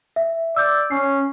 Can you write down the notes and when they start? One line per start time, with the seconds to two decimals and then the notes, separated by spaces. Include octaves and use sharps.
0.16 E5
0.56 D5 E6 G6
0.91 C#4 C7